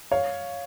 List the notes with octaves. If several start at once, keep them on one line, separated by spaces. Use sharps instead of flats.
C#5 F5